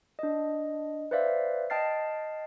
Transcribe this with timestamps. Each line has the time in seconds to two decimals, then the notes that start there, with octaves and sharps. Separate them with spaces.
0.19 D4 D#5
1.11 B4 C5 D5 E5 F5
1.70 D#5 G5 A5 F6 A6 C7